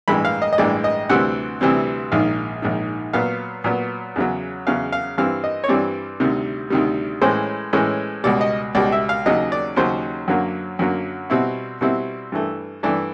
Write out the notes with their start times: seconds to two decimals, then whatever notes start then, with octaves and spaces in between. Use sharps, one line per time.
0.08 A1 G2 E3 G#3 B5
0.25 F5
0.42 D#5
0.53 D#5
0.58 A1 G2 E3 G#3 D5
0.84 D#5
1.09 D2 C3 E3 G3 C4 F#5
1.61 D2 C3 E3 G3 C4
2.12 A#1 G#2 D#3 F5
2.62 A#1 G#2 D#3
3.13 A#2 F#3 B3 F5
3.64 A#2 F#3 B3
4.16 E2 C#3 F#3
4.67 E2 C#3 F#3 F5
4.92 F5
5.18 G2 E3 G3 C4 F5
5.44 D#5
5.64 C#5
5.68 G2 E3 G3 C4 D5
6.20 D2 C3 D#3 G3
6.70 D2 C3 D#3 G3
7.22 A2 E3 G#3 C#4 C5
7.73 A2 E3 G#3 C#4
8.24 C#2 B2 G3 D5
8.41 D#5
8.75 C#2 B2 G3 D5
8.92 E5
9.09 F5
9.26 D#2 C#3 F#3 D#5
9.52 D5
9.76 D#2 C#3 F#3 C5
10.28 F#2 D3 F#3 A#3
10.79 F#2 D3 F#3 A#3
11.30 B2 G3 C4 E4
11.81 B2 G3 C4 E4
12.32 G2 E3 A3
12.83 G2 E3 A3 D5